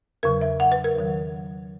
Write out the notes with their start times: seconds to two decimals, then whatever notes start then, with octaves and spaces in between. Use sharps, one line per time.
0.23 E2 C#3 F#3 A#4
0.41 E5
0.60 F#5
0.72 B4
0.84 A#4
0.97 E2 D#3 F#3